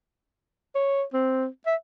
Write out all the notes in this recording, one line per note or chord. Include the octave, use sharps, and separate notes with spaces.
C#5
C4
E5